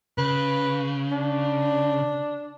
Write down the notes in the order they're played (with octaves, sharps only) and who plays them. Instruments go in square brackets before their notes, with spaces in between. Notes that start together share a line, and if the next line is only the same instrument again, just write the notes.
[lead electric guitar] C#3 [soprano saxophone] B4
[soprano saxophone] D4